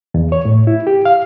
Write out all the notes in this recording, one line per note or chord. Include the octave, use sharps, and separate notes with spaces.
E2
C#5
A2
E4
G4
F5